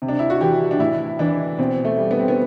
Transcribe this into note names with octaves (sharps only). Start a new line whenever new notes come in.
C3
D4
E4
F#4
E3 G4
D4
A2 E4
E3 D4
B2 C4
A3
G3
B3
C4
B3